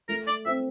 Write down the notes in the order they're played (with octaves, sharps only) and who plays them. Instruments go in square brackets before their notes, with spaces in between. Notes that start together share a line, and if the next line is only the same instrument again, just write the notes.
[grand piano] A3 [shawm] A#4
[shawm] D5
[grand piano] C4 [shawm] E5